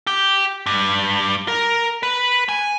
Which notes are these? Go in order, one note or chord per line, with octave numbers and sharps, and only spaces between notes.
G4
G2
A#4
B4
G#5